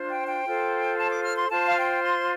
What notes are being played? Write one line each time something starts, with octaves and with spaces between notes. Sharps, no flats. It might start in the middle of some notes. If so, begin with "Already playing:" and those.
Already playing: D4 F4 C5
G5
G5
F4 A4 C5
A5
D6
F6
C6
F4 C5 A5
F5
G5
C6